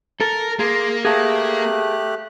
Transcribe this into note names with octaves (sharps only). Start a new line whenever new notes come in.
A4 A#4
A#3 G#4 C6
A3 G4 G#4 F5 A5 F#6